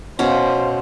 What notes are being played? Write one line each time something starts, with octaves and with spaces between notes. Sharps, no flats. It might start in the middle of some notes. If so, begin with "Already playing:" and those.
B2 C#4 C5 F5